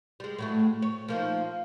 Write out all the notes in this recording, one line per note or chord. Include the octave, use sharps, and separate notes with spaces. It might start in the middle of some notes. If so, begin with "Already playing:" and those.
G3 G#3
A2 F#3 A3
C#5
F3 A#3 D#4